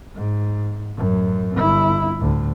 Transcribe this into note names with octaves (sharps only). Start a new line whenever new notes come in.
G#2
A1 F#2
G1 E4
D2 A2